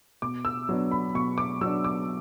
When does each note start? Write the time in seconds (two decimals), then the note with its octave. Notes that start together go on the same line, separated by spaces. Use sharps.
0.22 B2 D6
0.45 E6
0.69 F#3 B3 D4
0.91 B5
1.15 B2 C#6
1.38 D6
1.61 F#3 B3 D4 E6
1.84 D6